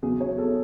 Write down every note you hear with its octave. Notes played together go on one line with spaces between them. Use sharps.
E2 C#3 F#3 G#4
C#5
A4